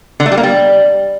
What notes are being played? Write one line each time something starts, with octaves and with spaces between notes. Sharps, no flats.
D3
A3
G3
A#3
G3